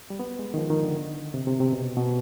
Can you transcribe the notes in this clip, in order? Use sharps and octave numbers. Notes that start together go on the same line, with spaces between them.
G3
B3
G#3
D#3
F3
D#3
D3
C3
C3
C3
B2
B2